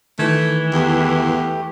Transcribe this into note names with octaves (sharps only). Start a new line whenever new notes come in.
D#3 E3 A3 G#6
E2 A3 G4